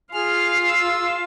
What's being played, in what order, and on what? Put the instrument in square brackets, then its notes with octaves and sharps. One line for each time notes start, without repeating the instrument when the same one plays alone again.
[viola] F4 F5 [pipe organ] G#4 F6
[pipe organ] E6